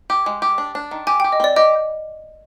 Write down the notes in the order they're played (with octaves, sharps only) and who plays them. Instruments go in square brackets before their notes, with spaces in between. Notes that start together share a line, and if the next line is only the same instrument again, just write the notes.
[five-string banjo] G4
G#3
G4
D4
D4
D#3
[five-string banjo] G4 [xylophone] G#5
[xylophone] G5
[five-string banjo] G4
[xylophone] D#5
[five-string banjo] C4 [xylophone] D5
[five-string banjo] G4 [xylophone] D#5